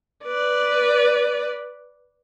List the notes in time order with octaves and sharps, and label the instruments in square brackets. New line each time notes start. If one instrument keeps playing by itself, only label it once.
[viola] B4 D5